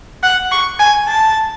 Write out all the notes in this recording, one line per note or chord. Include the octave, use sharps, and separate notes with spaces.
F#5
C#6
G#5
A5